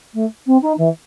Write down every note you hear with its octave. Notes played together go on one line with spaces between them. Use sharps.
A3
C4
D#4
E3